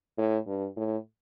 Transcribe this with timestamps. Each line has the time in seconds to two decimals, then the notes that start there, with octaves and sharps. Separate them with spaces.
0.18 A2
0.47 G2
0.76 A2